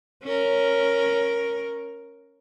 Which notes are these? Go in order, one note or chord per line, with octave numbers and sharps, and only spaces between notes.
C#4 A#4